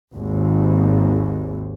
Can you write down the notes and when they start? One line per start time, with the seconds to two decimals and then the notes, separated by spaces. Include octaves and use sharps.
0.14 G#1 D#2 G#2